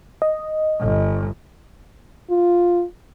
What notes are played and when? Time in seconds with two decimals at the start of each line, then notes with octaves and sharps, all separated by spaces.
0.22 D#5
0.80 G1
2.30 F4